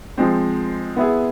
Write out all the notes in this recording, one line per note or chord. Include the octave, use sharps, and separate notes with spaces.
F3 G#3 C4
B3 E4 G#4